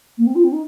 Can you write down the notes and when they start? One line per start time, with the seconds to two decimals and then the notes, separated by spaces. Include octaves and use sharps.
0.18 A#3
0.26 C4
0.35 F4
0.44 C4
0.52 D#4